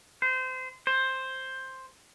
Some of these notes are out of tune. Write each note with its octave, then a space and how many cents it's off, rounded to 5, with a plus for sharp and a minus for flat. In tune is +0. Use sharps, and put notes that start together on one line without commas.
C5 -25
C5 +10